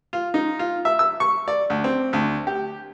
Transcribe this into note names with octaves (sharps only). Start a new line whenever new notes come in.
F4
D#4
F4
E5
E6
C#6
D5
D2
C4
D2
G4